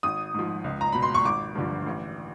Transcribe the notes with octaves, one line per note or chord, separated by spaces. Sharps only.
G#1 D#6
G#2 F3
C#2
A#5
B2 B5
C6
C#6
G#1 D6
G2 D3 F3
A1